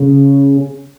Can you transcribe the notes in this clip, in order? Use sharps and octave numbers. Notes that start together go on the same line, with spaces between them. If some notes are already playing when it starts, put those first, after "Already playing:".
Already playing: C#3